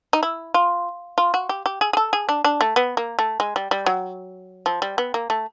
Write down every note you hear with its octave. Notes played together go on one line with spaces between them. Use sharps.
D#4
E4
F4
F4
F#4
G4
G4
G#4
G#4
A4
G#4
D4
D4
A3
B3
A#3
A3
G#3
G3
G3
F#3
F3
G3
B3
A#3
A3